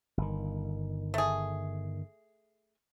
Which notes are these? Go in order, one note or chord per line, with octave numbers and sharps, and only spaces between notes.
G1 D#3
A3 G#4